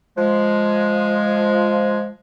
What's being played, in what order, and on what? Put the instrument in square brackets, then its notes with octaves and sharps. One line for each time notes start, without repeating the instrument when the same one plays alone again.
[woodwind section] F3 G#3